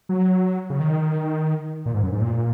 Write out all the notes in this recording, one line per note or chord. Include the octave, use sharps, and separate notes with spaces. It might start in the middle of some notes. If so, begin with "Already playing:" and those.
F#3
C#3
D#3
A#2
G#2
F#2
G#2
A#2